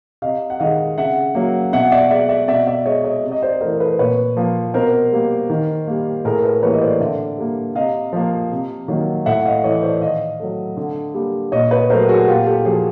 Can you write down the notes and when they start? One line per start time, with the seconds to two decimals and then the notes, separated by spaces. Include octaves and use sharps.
0.22 C3 D#5 F5
0.50 F#5
0.60 D#3 G#3 D#5 F5
0.98 C#3 E5 F#5
1.35 F#3 A#3
1.73 B2 E5 F#5
1.92 D5 E5
2.10 G#3 D5 E5
2.29 D5 E5
2.48 B2 D5 E5
2.67 D5 E5
2.86 G#3 C#5 D#5
3.04 C#5 D#5
3.24 C3
3.32 D#5
3.42 C5 D5
3.61 E3 A3 A#4 C5
3.80 A4 B4
3.99 A#2 B4 C#5
4.37 F3 A#3
4.74 B2 A#4 C5
5.12 G3 A#3
5.50 D#3
5.88 G3 A#3
6.25 A2 G#4 A#4
6.44 A4 B4
6.63 E3 G3 A#3 B4 C#5
6.73 D#5
6.81 C5 D5
7.00 D3 D5 E5
7.38 G3 A#3
7.75 C3 D#5 F5
8.13 F3 A#3
8.51 C3
8.88 D#3 F#3 A#3
9.26 A2 E5 F#5
9.45 D#5 F5
9.64 E3 A3 C#5 D#5
9.83 C5 D5
10.01 D#3 D#5 F5
10.40 F#3 A3
10.77 D3
11.14 G3 A#3
11.52 A#2 C#5 D#5
11.71 B4 C#5
11.90 F#3 A3 A#4 C5
12.08 F#4 G#4
12.27 A#2 F4 G4
12.46 G4 A4
12.65 F3 A#3 F#4 G#4